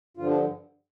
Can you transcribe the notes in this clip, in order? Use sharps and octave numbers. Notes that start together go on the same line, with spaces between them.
G2 D3 F3 F4
D4